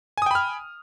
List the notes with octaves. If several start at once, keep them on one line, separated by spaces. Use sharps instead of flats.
G5 G#5 B5 D#6 F6